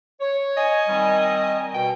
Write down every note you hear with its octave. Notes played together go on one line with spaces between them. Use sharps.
C#5
D#5 G#5
D#3 G3 C4
B2 G5